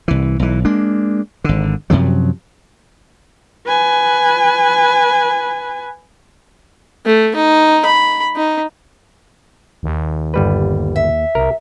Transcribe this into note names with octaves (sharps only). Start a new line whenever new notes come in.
C2 E3
B1 E3
G#3 A#3 D4
G#1 D3
F#2 C3 F3 F#3
B4 G#5
A3
D#4
B5
D#4
D#2
G1 G3 B4
E5
C2 A#4